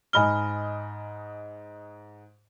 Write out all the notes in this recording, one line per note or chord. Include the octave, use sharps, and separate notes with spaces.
G#2 D#5 G#5 B5 F6 G7